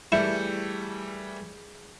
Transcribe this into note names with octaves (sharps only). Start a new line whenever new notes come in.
E3 G3 A3 E4 G#4 G6 C#7